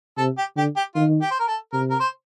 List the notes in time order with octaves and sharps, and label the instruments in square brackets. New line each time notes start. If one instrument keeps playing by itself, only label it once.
[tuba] C3 [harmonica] A4
[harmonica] G4
[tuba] D3 [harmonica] G4
[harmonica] G4
[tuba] D#3 [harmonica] F4
[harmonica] G4
C5
A#4
A4
[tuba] C3 [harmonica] A#4
[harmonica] A#4
C5